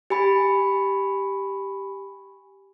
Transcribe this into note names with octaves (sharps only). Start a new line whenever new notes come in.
G4 G#5 B5